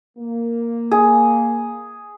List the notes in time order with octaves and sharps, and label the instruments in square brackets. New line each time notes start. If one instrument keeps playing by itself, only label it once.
[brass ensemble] A#3
[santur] G#4